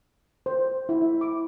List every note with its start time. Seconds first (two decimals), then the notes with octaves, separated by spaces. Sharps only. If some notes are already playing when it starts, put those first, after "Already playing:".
0.46 C5
0.89 E4
1.02 E5
1.21 D6